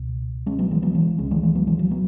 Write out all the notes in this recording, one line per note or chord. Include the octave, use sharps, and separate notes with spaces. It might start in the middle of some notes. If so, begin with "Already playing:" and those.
Already playing: C#2 B2
G#3 C#4
F#3 B3
E3 G#3
F#3 B3
E3 G#3
C#2 C#3 G#3 C#4
E3 G#3
E3 G#3
F#3 B3
E3 G#3
F#3
F#3 B3